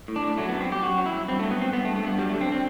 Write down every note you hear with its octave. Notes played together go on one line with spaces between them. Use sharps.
A2
D4
A2
F#3 A3
B3
F#2
C4
F#2 G4
F#2 F#4
F#3
E4
F#2
G2 C4
A3
F#3
B3
G2 C4
G2 B3
A3
G2
A3
G2 B3
F#3 G3
A3
D3
C4
C4